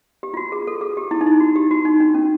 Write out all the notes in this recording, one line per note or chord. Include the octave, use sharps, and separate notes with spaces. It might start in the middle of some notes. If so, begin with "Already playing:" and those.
G4
F4
F#4
G#4
A4
G#4
G4
E4
D#4
E4
F#4
G4
F#4
D#4
D4
C#4